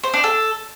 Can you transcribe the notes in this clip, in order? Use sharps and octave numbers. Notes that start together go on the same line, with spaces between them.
C5
D4
A4